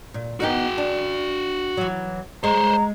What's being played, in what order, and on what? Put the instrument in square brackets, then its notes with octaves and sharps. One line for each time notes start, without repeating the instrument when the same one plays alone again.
[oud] A#2
[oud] B3 D#4 A#4 [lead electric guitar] F#4 G5
[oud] D4
E3 F#3
[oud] G#3 [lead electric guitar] C5 C#5 [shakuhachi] A#5